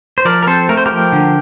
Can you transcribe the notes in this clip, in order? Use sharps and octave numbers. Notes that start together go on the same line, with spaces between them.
C5
F3 A#4 D5
A#4
C4 A4 C5
A3 A#4
C5
F3 G4 A#4
D3